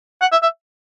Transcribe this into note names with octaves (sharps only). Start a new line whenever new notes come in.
F#5
E5
E5